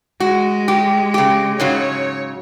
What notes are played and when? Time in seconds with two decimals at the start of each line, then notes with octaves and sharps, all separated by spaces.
0.20 G#3 F#4
0.68 G4
1.14 C#3 G4
1.60 G#2 C#3 F#3 C#5